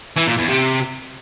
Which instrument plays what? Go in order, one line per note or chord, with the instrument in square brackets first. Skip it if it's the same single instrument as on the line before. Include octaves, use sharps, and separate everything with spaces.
[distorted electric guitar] E3
A#2
E2
C3